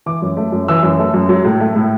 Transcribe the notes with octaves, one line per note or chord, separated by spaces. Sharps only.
E3 D6
F#2
A3
F#2
E3 E6
F#2
A3
F#2
F#3
A2
A3
A2